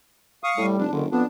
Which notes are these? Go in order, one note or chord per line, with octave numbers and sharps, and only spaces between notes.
F5 C#6 D#6
A2 G3
F1 D4
F#1 D3 D#3
F2 B3 D4